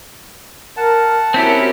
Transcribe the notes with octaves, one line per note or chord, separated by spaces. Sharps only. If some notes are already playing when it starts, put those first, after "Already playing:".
A#4 F#5 A5
C4 C#4 E4 F#4 G4 A#4 B6